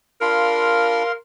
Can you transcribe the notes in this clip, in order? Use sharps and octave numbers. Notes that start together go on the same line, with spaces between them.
D4 F4 A#4 F5 B5 C6